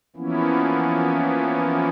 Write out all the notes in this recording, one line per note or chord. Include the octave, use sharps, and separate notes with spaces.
E3 F3 A#3 B3 C#4 E4